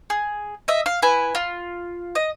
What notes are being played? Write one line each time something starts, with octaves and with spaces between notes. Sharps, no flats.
G#4
D#5 E5
F5
E4 B4 G#5
F4
D#5